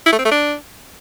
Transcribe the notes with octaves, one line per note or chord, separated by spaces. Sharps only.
E4
A3
C4
A3
D4